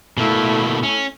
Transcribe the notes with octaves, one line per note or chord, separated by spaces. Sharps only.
B2 A3 A#3 E4
C#4